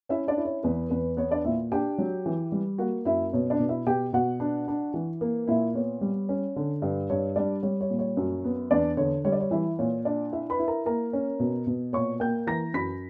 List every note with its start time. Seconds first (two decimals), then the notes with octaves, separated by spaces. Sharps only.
0.09 C#4 E4 E5
0.28 D4 D5
0.37 E4
0.45 C#5
0.63 E2 B4
0.90 E2 B4
1.17 B3 C#5
1.31 D4 D5
1.44 A#2 E4 E5
1.72 D4 G4 G5
1.98 F#3
2.26 E3
2.52 G3
2.78 A#3 F#4 F#5
3.05 F#2 E4 E5
3.33 B2 C#5
3.50 D4 D5
3.59 B2
3.69 E4 E5
3.86 B2 G4 G5
4.13 B2 F#4 F#5
4.40 D4
4.68 D4
4.94 E3
5.21 A#3
5.47 A#2 E4 E5
5.74 B3 C#5
6.01 G3
6.29 C#4
6.56 D3
6.82 G2
7.10 G2 C#5
7.36 G3 D4 D5
7.63 G3 C#5
7.81 C#5
7.90 A#2
7.99 C#5
8.17 F#2
8.45 B3
8.71 E2 D4 D5
8.97 D3 C#5
9.24 G3 C#5
9.32 D5
9.40 C#5
9.51 E3 E4 E5
9.79 A#2 C#5
10.05 D4 D5
10.32 E4 E5
10.50 B4 B5
10.59 E4
10.68 A#4 A#5
10.86 A#3 A#4 A#5
11.13 C#4
11.39 B2
11.67 B2
11.93 A#2 C#5 C#6
12.20 A#3 G5 G6
12.47 E3 A#5 A#6
12.74 F#2 B5 B6